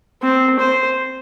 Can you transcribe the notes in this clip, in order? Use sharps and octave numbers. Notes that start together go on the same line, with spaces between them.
C4
C5